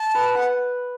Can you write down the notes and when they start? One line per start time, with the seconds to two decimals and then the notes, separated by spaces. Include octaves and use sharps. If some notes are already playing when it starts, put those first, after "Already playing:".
Already playing: A5
0.15 B4
0.35 B4 F#5